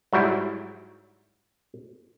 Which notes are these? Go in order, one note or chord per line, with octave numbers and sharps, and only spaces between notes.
G#2 F#3 G3 E4